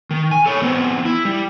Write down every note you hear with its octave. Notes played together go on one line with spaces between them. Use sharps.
D#3
G#5
A4 C#5
E3 B3 C4 C5
E4
G3